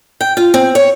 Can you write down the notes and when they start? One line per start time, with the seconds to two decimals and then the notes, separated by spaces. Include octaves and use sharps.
0.21 G5
0.37 F4
0.54 C4
0.75 C#5